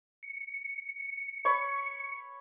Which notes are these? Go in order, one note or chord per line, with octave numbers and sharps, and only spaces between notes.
C#7
C#5 B5 C#6